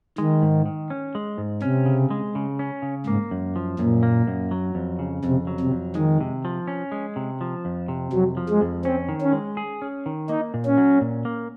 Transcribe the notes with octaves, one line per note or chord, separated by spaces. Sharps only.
D#3 G#3
G#2
D#3
C#4
G#3
G#2
C3 C#4
C#3
G#3
C#3
C#4
C#3
G#2 A#3
F#2
F3
F#2 A#2
A#3
F#2
F#3
F2
C#3
F2 C3
F#3
C3
F2
D#3 G#3
C3
F3
C#4
G#3
C3
F3
F2
C3
F2 F#3
F3
G#3
F2
C4 C#4
D#3
C#4
G#3
G#4
C#4
D#3
A#3 D#4
A#2
C#4
F#3
A#2
A#3